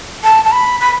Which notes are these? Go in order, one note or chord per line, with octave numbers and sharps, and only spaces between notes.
A5
A5
B5
B5